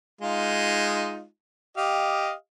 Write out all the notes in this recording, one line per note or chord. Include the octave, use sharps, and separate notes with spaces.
G#3 D#4 F4
G4 D#5 F5